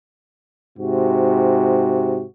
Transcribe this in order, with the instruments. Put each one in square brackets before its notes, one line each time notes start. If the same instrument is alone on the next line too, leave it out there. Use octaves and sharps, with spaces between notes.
[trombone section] G#2 C3 F#4